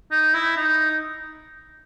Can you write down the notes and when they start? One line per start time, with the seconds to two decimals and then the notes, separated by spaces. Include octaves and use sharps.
0.11 D#4
0.34 E4
0.57 D#4